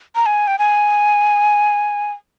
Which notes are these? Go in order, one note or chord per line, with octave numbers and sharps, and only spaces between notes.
A#5
G#5
G5
G#5